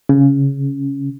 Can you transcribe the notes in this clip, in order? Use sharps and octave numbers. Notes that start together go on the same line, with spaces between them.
C#3